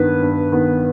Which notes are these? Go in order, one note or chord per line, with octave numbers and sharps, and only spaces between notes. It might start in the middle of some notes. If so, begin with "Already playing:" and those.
Already playing: G2 D#3 B3 B4
G2
D#3 B3